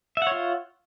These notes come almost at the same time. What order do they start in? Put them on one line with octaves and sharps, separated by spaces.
E5 F#5 C#5 F4